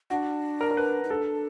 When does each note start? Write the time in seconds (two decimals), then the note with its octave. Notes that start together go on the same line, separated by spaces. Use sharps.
0.10 D4 F#4
0.61 A#4
0.71 A#4
0.77 B4
1.04 D#4
1.10 D4 A4